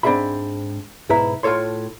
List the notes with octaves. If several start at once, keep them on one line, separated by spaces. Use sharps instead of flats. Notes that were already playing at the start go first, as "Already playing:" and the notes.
G#2 C4 D4 G#4 E5 B5
B1 G#2 E4 B4 E5 A#5
A2 F4 G#4 A4 C#5 C6